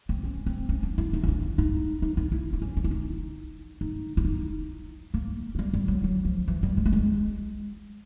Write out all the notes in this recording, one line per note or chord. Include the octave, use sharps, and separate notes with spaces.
C4
C#4
C4
C#4
D4
E4
D#4
C#4
D4
D#4
D#4
D#4
E4
D4
C#4
C#4
E4
D#4
D#4
E4
D#4
A#3
F#3
G3
G3
F#3
F#3
F3
E3
G3
G#3
A3
G#3